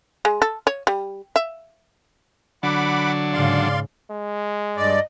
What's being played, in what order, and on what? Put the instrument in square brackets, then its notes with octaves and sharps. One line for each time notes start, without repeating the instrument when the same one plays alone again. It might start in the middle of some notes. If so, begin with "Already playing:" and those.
[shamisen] G#3
A4
C#5
G3
E5
[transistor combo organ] D3 F#3 D4 [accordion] F#5 B5 D6
[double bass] G#2 C#3 [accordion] D5 F5 C6
[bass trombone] G#3
[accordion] G2 D5 [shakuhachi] D#5